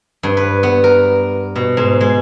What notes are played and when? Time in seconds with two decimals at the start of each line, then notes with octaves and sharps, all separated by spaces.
0.23 G2
0.37 B4
0.63 B3
0.84 A#4
1.56 B2
1.77 G#2
2.01 G#3